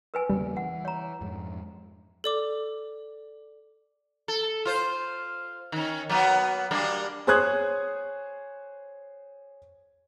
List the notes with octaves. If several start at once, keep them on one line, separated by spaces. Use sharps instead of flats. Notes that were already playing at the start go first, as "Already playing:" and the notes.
A#4 B4 G#5
E2 C#3 G3 A#3
E3 F#5
C#5 A#5
F2 G#2
A4 D5 D6
A4
F4 C5
D#3 C#4
F#3 A#3 B3
G3 A#3 D4
G#4 C5 C#5 D#6 F#6 G#6